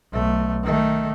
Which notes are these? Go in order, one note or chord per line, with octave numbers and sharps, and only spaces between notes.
B1 A3
D#3 A3